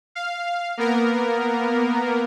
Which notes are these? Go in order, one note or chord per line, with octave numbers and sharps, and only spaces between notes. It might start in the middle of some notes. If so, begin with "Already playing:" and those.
F5
A#3 B3 A#4